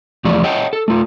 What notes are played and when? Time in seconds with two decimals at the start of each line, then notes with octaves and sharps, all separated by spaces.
0.24 E2 F3 A3 G4 D5
0.43 C#5 D#5 F#5 G5
0.73 A4
0.88 A3 F4